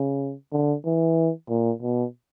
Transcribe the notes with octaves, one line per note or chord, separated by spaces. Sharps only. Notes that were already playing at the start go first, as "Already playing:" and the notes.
Already playing: C#3
D3
E3
A#2
B2